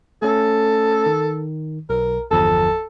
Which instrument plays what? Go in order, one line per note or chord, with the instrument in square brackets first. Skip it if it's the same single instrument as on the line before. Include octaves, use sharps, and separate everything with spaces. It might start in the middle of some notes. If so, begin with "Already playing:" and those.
[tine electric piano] A3 C#4 [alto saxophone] A4
[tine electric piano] D#3
[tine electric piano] B1 [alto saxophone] A#4
[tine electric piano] G1 E2 F3 [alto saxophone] A4